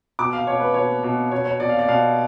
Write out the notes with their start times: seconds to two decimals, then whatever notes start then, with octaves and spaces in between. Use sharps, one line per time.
0.19 B2 D6
0.33 F5
0.47 B2 C#5
0.60 B4
0.74 B2 C#5
1.03 B2
1.32 B2 C#5
1.46 C#5
1.60 B2 D5
1.69 F5
1.79 D5
1.88 B2 F5